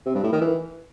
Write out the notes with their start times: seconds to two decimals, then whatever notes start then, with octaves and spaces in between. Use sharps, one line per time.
0.06 C3
0.15 G2
0.24 A2
0.32 D#3
0.41 E3